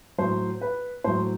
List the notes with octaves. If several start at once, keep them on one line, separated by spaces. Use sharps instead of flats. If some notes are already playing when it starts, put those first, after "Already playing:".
A2 F#3 C5
B4
A2 F#3 C5